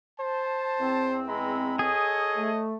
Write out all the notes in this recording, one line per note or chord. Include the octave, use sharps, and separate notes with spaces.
C5 A5
E2 C4
G#3 A#5 B5
G#4 A4 C#5 D#5
A3